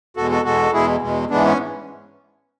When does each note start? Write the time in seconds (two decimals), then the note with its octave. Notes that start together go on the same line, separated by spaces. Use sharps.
0.17 E2 B2 G#3 F#4 A4
0.31 F#4 A4
0.45 E2 B2 G#3 F#4 A4
0.73 E2 B2 G#3 E4 G#4
1.02 E2 B2 G#3
1.30 G#2 E3 G#3 B3 D4
1.45 C#4